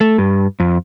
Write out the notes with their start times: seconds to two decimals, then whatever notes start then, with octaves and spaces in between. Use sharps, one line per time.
0.01 A3
0.18 G2
0.60 F2